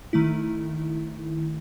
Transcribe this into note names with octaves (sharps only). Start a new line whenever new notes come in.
D#3 A3 E4